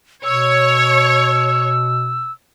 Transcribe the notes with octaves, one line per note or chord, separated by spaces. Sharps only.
B2 C#5 E6